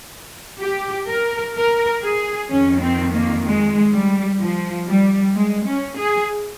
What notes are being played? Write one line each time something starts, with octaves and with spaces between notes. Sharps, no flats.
G4
A#4
A#4
G#4
F2 D#3 C#4
C4
A#3
G#3
G3
F3
G3
G#3
C#4
G#4